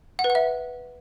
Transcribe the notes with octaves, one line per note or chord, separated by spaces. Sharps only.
F#5
B4
F#5
E5